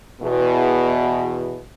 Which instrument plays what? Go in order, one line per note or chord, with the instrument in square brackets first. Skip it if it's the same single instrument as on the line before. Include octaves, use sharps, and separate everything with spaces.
[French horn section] E2 B2